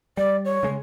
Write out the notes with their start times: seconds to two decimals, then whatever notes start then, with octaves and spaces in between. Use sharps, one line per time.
0.17 G3 D5
0.45 C#5
0.63 C#3 G#3